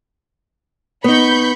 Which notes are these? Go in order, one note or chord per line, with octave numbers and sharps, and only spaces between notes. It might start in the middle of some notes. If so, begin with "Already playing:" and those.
B3 D#4 B5 C#6 G6